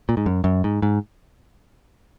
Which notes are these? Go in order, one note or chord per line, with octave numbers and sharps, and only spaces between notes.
A#2
G#2
F#2
F#2
G#2
G#2